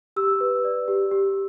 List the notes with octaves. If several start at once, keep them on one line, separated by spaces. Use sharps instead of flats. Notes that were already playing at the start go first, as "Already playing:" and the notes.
G4 E6
B4
D5
G4
G4